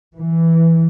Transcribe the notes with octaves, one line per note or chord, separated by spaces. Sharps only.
E3